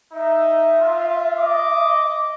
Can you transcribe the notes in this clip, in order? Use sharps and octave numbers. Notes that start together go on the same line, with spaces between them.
D#4 E5
F4
D#5 D6